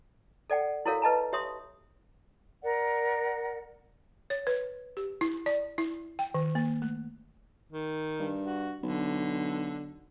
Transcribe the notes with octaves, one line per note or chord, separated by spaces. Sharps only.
A4 D5 F#5 G5
E4 F#4 A4 A#4 C#5 F5
B4 D#5 A5 A#5
G4 C#5 E5 C6 D#6
A#4 D5 F#5
C#5
B4
G4
E4
D5
E4
G5
D#3
A#3
A3
D#3
G2
F#4
B1 D3